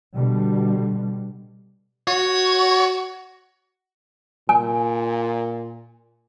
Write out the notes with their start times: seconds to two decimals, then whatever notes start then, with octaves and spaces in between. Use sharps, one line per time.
0.15 B2 D3 G3
2.07 F#4 C#5
4.49 A#2 G#5